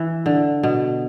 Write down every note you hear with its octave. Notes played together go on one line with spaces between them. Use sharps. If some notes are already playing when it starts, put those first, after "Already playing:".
Already playing: E3
D3
B2